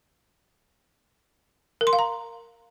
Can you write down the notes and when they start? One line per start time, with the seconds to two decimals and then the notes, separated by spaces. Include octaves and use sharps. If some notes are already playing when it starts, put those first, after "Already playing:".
1.81 A#4
1.87 C6
1.93 F5
1.99 A#5